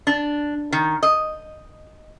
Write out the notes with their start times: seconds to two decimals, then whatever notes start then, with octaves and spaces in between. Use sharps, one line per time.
0.07 D4
0.72 D#3
1.03 D#5